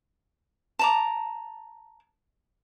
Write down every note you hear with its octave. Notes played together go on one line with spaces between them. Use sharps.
A5 A#5 D6